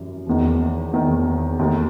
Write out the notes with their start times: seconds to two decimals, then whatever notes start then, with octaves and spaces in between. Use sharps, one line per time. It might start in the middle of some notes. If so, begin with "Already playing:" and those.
Already playing: F#2 E3 G3
0.26 E1 E2 D#3
0.93 E1 E2 D#3
1.59 E1 D#2 D#3 A3 D#4